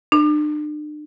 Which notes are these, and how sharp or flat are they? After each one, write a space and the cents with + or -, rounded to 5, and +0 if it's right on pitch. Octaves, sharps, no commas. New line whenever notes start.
D4 +40